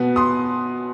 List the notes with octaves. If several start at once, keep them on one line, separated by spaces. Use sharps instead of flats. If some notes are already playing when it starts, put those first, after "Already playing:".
Already playing: B2 B3
C6 D#6